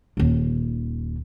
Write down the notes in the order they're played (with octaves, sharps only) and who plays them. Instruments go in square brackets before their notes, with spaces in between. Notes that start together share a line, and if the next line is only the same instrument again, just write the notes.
[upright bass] D#1 D#3